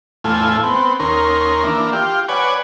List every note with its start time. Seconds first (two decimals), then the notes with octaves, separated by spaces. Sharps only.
0.24 E2 A2 A3 F4 G#5
0.63 B3 C4
1.00 D#2 C#4 A#4 C6
1.63 E3 A#3 D4
1.93 F4 G4
2.29 B4 C#5 D5 F#5 G#5